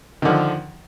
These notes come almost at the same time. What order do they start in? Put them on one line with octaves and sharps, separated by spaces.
D#3 D3 F3